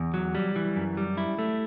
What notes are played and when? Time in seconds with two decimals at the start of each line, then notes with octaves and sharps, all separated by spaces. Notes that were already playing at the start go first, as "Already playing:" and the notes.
Already playing: E2
0.14 F#3
0.35 G3
0.56 E3
0.76 F#2
0.97 G3
1.17 E4
1.38 A3